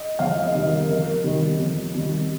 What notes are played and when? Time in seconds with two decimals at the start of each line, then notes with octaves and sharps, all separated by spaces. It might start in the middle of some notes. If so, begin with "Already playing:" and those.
Already playing: D#5
0.19 F2 F5
0.43 D#5
0.55 C3 D#3 G3
0.66 A#4
0.89 F2 A#4
1.24 C3 D#3 G3
1.60 F2
1.95 C3 D#3 G3